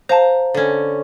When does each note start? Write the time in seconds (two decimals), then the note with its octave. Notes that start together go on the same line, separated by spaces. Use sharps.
0.09 C5 F5 A5 A#5
0.54 D3 C#4